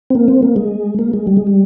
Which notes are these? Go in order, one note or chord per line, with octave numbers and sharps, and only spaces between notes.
C4
A#3
C4
A#3
G#3
A#3
G#3
G3
G#3
G3